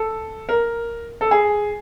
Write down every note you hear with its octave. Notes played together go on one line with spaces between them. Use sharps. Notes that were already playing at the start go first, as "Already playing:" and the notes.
Already playing: A4
A#4
A4
G#4